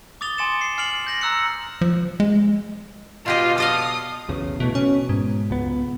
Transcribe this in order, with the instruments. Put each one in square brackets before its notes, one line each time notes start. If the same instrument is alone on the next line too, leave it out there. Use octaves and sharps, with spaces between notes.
[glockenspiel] D6 D#6 A6 F7 G7
G#5 C6 A6 C#7 E7
C7
G#5 F6 C7 D7 F7 F#7
G6 A#6 F#7
A#5 E6 F#6 C#7
[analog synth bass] F3
G#3
[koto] B2 G4 D#5 [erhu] F4
[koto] A4 D#5 F5 [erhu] D#6
[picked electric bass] B1 E2 C#3
[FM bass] B2 [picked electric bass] E3 A3
[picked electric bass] B2 [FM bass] C#4
[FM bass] G#2
[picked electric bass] C#2 B3